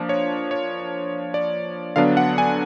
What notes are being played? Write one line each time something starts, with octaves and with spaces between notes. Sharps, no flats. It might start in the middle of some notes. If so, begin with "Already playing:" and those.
Already playing: F3 A#3 D4
C#5
C#5
D5
D3 F#3 B3 D4 F5
F#5
G#5